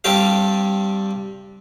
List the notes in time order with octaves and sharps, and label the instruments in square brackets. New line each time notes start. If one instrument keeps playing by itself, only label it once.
[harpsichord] G2 G3 C4 D4 G4 F5